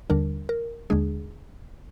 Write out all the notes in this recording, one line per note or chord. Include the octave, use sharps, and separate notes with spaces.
D#2 D3 G3 D4 A#4
A#4
D#2 D3 G#3 D4 G#4